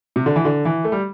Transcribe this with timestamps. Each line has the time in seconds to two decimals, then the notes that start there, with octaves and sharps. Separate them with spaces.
0.16 C3
0.26 D3
0.36 E3
0.45 D3
0.65 E3
0.84 A3
0.92 G3